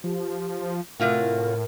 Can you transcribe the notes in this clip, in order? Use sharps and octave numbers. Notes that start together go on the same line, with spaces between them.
F3 G4
A2 C3 F4 F#4 A#4